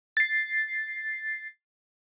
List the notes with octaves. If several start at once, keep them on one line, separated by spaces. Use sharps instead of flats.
A6 C7